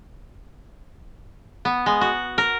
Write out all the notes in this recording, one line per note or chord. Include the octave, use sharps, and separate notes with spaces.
B3
G#3
F#4
A#4